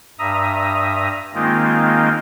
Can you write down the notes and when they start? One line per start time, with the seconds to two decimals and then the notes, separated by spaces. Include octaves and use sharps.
0.19 G2 E5 A#5 D#6
1.35 D#3 G#3 A#3 C4 D#4 F4